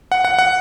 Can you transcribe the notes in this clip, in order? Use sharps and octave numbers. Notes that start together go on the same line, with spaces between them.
F#5
F#5
F#5